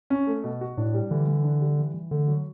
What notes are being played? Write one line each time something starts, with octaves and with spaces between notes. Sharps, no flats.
C#4
A3
B2
F#4
A2 D4
G3
D3 E3
E3
D4
G3
E3
E3
D3 A3
F#3